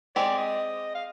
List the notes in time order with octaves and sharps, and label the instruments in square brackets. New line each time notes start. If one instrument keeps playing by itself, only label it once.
[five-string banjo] G#3 C4 G4 [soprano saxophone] D5
[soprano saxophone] D#5
F5